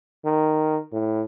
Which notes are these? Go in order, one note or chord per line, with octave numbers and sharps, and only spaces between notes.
D#3
A2